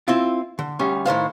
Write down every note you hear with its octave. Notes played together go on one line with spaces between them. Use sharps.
C4 E4 F4
D3
D2 G3 C#4
A2 D#3 C5 F5